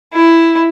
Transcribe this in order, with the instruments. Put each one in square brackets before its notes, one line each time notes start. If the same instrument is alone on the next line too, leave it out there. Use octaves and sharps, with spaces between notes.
[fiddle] E4